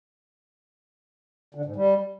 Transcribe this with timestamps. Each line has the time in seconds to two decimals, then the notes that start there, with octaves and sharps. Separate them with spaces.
1.55 D3
1.65 G#2
1.76 G3